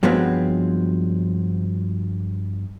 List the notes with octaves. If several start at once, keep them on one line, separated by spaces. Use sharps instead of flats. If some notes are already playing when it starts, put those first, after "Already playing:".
G2 F3 F#3 G#3 B3 C4